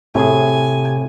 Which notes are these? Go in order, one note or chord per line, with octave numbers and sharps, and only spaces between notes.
A2 C3 G#4 G#5